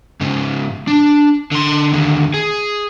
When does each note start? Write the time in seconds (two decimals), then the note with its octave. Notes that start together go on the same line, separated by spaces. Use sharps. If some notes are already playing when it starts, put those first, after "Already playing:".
0.21 G#2 C#3
0.87 D4
1.52 D3 C6
1.93 D#2 D3
2.34 G#4